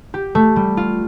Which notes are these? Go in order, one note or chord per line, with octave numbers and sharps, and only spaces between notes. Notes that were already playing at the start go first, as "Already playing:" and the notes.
G4
A3
G3
F4